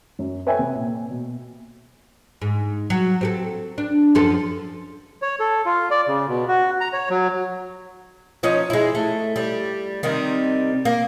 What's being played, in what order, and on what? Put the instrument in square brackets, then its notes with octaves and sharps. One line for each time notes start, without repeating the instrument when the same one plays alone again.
[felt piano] F#2
A4 B4 C#5 E5 G5 G#5
C3
A#2
B2
[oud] G#2
F#3
C4 G4 A4
D4
F#2 F3 A4
[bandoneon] C#5
A4
F4
D5
C#3
B2
F#4
A#5
C#5
F#3
[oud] F3 C#4 D#4
G#3 E4
A3
G3
C3 D#3 G3
A#3